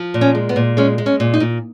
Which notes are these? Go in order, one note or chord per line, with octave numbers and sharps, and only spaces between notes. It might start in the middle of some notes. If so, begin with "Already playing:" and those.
Already playing: F3
A#2
C#4
G#3
B3
A#2
G#3 C#4
G#3
C#4
A#2
D#4
A#2